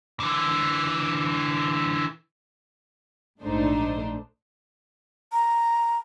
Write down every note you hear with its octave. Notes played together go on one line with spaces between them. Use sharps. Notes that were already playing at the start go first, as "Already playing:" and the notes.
D3 E3
A#1 G#2 A3 D4 D#4 C5
A#5